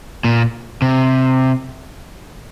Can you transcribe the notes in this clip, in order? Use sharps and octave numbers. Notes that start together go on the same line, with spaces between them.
A#2
C3